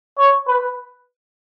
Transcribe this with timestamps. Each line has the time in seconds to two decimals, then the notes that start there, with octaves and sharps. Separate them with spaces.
0.18 C#5
0.48 B4